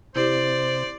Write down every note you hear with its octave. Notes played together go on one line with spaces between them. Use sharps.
C3 E4 G4 C5 D5